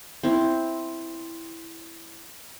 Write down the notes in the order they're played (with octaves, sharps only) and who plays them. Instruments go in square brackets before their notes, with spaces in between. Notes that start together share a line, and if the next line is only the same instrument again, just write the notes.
[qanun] C4 E4